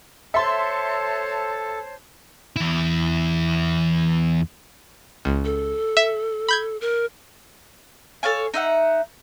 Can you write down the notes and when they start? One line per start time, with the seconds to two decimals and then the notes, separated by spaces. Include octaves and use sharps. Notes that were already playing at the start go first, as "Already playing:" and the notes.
0.34 A4 C5 C#5 E5 A5 C6
2.56 E2 E4
5.25 C#2
5.45 A4
5.97 E5
6.48 B5 G6 G#6
6.81 A#4
8.23 A4 C#5 F5 G#5
8.54 D#4 E5 F#5